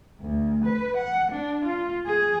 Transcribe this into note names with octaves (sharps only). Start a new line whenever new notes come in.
D2
B4
F#5
D4
F4
G#4